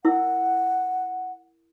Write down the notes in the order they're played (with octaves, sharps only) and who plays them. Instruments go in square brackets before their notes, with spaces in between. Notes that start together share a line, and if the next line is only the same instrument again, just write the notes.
[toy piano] E4 A#4 E6 [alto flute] F#5